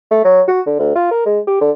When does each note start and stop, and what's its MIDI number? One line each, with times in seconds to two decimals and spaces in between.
0.11 0.25 57
0.25 0.42 54
0.48 0.61 66
0.66 0.77 50
0.80 0.95 38
0.95 1.09 65
1.11 1.23 70
1.26 1.40 56
1.47 1.57 67
1.61 1.71 50